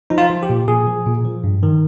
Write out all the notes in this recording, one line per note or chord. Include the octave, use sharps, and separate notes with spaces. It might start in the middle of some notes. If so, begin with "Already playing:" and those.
F3 D#4
F4
F3
G4
A#2
A#2 G#4
F3
A#2
F3
G2
D#3